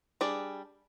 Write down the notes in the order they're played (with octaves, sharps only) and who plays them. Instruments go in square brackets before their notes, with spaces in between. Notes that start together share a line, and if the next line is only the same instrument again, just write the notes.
[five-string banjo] G3 D4 G#4 D5